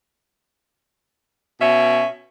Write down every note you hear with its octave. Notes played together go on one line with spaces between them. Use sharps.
B2 C#4 E5